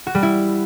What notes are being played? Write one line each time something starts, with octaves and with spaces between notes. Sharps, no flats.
F#4
G3
E4